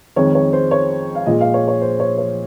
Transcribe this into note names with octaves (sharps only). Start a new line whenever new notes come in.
F2 D#3 G#3 C#5
C#5
C5
C#5
F5
A#2 F3 G#3 D#5
F5
C#5
C#5
C5
C#5
C#5